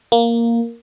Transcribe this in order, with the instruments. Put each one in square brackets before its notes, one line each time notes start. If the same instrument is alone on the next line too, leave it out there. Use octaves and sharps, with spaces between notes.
[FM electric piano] A#3